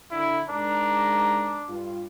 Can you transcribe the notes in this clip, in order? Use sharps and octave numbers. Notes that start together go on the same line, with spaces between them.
D3 E4
G#2 D4 A#4 A#5
G2 F4